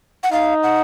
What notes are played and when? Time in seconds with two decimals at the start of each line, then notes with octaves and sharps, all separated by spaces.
0.23 F#5
0.32 D#4 F5
0.63 F#5